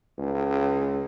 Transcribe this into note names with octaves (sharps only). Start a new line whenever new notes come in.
C#2